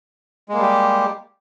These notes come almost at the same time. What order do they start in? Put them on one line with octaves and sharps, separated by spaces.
G#3 A#3 G3 G4